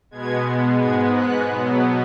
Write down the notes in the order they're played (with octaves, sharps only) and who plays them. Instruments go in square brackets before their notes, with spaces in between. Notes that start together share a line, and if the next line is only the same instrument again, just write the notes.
[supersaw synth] B2 G#3 B3 G#6
G#2 G#3 B3 G#6
F#6
B2 F#3 B3